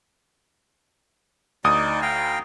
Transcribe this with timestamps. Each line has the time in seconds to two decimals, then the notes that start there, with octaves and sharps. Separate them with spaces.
1.64 D2 D#4 D5 D#6
2.02 F5 G5 A#5